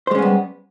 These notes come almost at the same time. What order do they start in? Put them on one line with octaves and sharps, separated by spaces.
C5 G#3 C#4 B3 G3